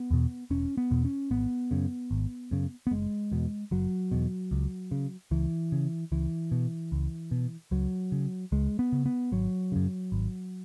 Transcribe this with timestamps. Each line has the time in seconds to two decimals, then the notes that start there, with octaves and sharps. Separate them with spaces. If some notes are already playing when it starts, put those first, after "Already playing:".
Already playing: B3
0.11 E2 B2
0.50 E1 C#4
0.77 B3
0.91 E2 B2
1.05 C#4
1.31 G#1 B3
1.71 F#2 C#3
2.11 G#1
2.51 F#2 C#3
2.87 B3
2.91 F#1 G#3
3.31 E2 B2
3.71 F#1 F#3
4.11 E2 B2
4.51 C#2
4.91 C#3
5.31 C#2 E3
5.72 C#3
6.12 C#2 E3
6.51 B2
6.92 C#2
7.31 B2
7.71 C#2 F#3
8.12 C#3
8.52 C#2 G#3
8.79 B3
8.92 C#3
9.06 B3
9.32 G#1 F#3
9.72 F#2 C#3
10.12 G#1